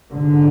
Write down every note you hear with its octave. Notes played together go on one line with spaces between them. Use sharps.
A1 G#2 D3